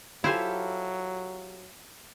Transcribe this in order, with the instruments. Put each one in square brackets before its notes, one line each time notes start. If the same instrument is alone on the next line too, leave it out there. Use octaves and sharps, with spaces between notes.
[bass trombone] F#3 [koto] E4 C5 G#5 [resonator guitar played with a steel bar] F4 G4 A4